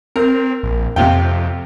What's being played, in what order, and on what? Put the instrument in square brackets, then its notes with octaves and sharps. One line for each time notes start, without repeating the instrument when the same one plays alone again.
[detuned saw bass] C4 [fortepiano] A#4
[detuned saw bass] A#1
[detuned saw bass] F2 [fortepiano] C3 F4 G5